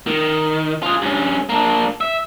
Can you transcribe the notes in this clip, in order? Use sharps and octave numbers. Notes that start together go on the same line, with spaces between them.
D#3
F4 G#4
G2 C#4
A#3 D4
E5